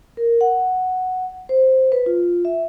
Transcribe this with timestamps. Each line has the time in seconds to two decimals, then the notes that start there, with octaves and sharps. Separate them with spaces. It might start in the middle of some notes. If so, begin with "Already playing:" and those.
0.17 A#4
0.41 F#5
1.49 C5
1.92 B4
2.06 F4
2.45 E5